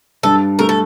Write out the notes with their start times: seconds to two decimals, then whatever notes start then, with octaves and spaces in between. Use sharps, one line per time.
0.23 G2 A4
0.59 A3 A#4
0.69 A4